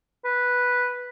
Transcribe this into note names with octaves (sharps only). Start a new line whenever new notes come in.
B4